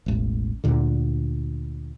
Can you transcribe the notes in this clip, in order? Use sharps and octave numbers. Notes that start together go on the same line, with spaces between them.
E1 A1
D2 A#2 D3